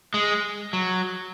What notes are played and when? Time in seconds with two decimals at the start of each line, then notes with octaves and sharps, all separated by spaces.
0.14 G#3
0.73 F#3